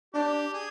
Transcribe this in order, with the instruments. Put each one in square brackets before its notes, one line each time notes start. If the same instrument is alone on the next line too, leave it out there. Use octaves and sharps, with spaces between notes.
[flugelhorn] D4 [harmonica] G4
[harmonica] G#4